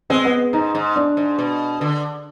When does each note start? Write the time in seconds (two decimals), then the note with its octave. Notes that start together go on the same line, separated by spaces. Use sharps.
0.10 G#3 C4
0.25 B3
0.53 G#2 D#4
0.75 G#2
0.96 D4
1.17 G#2
1.39 B2
1.81 D3